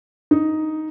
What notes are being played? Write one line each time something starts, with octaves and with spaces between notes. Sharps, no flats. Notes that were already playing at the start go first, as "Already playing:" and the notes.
D#4